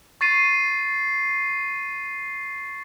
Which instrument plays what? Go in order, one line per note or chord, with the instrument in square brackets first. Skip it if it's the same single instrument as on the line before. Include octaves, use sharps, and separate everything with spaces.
[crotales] C#6 A6 C7 D#7